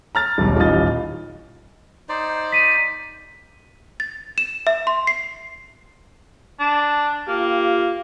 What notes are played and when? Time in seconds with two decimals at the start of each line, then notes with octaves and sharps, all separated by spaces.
0.15 A#5 F6 A6
0.38 D#1 B1
0.57 D#1 A1 D#4 F4 D#5 A6
2.09 D#4 C5 D5
2.52 B6 D#7
4.00 A6
4.38 E7
4.67 E5
4.87 C6
5.07 C7
6.60 D4
7.28 A#3 F4 G4